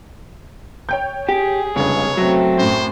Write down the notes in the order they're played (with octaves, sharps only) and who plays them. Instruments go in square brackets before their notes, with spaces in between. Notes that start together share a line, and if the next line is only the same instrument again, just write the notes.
[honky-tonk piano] C#5 G5 G6
[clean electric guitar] G4 [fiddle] G#4
[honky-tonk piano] F1 C#3 [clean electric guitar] C#2 G2 [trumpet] C#5
[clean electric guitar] F#3 [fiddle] A3 C4
[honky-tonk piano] F#2 A2 [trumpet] C5